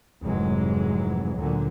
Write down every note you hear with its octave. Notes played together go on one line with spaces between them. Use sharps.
F1 G#2 E3 F#3 G#3
D2 A#2 D3 F#3